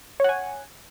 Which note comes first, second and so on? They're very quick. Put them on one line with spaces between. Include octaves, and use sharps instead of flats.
C#5 F#5 G#5